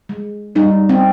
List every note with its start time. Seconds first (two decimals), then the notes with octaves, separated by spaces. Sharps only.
0.09 G#3
0.55 G3 D#4
0.89 C4